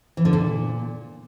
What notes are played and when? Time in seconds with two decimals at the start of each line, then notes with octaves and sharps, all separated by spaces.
0.17 E3
0.25 D3
0.33 A#2